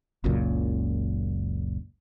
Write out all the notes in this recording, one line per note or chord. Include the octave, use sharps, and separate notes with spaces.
F#1 C#2 F#2 A#2